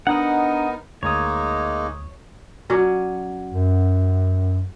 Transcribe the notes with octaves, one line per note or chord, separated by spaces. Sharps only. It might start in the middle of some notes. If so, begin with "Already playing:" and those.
B3 D4 D#4 A#4 D#5 F#5
D2 G#3 A#3 D#4 C#5 D#6
F#3 C#4 D5
F#2